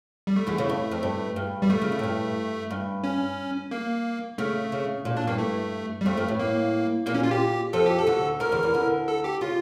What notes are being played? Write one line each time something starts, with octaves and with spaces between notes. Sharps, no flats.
G3
A3
E2 E3
C#3
G2
F2
G2
G2
G3
A#2 A3
C#3
A#2
A2
G2
G2
C#4
A#3
C#3 A3
C#3
A#2
A2 D4
G2 A#3
A3
G3
F2 A3
G2
A2
A#3
A#2 A#3
C#4
F4
G4
F2 F3 A4
G4
A4
D2 D3
D2 D3 A#4
E2 E3
E2 E3
D2 D3
A4
G4
C#3 F4